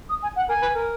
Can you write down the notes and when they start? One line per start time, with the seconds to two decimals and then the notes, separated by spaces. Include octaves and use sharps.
0.09 D#6
0.22 G#5
0.36 F#5
0.49 A#4 G#5
0.62 B4
0.75 A#4